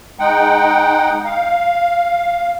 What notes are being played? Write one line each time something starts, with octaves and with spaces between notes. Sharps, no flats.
G#3 D#4 F#5 G5
F5